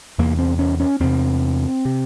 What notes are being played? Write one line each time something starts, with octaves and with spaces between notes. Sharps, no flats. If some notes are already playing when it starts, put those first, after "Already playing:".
E2 C3 A#3
C4
C#4
C#4
E2 C3 C4
C3